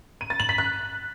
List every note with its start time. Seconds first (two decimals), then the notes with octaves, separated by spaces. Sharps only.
0.21 D#7
0.30 A6
0.40 F#7
0.49 B6
0.58 F#6